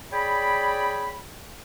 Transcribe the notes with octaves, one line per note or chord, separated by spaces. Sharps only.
G#4 C#5 D5 G5 B5